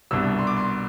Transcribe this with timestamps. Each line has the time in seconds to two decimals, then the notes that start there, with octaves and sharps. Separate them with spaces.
0.11 C2 B2 G3 D4 E6
0.38 C6
0.47 D6
0.57 C6